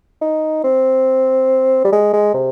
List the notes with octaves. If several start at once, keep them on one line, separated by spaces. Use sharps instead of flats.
D#4
C4
G3
G#3
G#3
C3